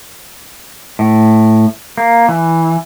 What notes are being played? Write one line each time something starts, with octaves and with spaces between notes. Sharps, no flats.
A2
A#3
E3